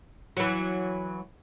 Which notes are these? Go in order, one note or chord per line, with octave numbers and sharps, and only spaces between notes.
E3 F#3